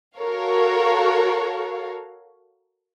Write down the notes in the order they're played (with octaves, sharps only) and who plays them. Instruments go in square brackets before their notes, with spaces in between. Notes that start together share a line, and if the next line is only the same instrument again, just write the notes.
[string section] F#4 A4 A#4 C#5 F5